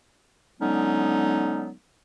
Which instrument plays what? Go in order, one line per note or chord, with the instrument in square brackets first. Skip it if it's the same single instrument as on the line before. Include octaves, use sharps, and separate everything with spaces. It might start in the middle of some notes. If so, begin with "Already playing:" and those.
[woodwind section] D3 F#3 G#3 B3 C#4 D#4